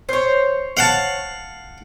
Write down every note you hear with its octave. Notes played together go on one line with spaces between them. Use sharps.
C5 C#5
F5 F#5 A5